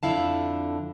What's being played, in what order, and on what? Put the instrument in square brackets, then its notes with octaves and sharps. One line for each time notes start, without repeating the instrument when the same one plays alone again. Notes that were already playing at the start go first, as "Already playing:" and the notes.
[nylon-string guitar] F2 D3 E4 F5 A5